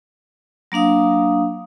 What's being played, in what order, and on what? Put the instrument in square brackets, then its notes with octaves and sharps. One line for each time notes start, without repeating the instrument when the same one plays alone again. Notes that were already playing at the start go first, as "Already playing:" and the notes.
[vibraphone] F#3 A#3 D4 F5 D#6